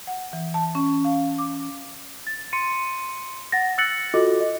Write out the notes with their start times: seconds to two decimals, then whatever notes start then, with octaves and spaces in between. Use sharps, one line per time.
0.07 F#5
0.33 E3
0.54 A5
0.75 C#4
1.05 F5
1.38 D6
2.27 A6
2.53 C6 C#7 D#7
3.52 F#5 A6 A#6
3.78 E6 F#6 A6 A#6 C#7 F#7
4.14 F4 F#4 A4 D#5 D6
4.40 D#5